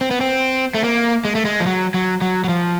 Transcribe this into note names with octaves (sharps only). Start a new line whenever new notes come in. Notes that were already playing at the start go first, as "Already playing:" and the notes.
C4
B3
C4
A3
A#3
G#3
A3
G#3
F3
F#3
F#3
F#3
F#3
F3